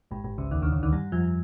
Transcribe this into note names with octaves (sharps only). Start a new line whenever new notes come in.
G#1 G#2
G#1 G#2
C#2 C#3
D#2 D#3
D2 D3
D2 D3
D#2 D#3
G2 G3
F2 F3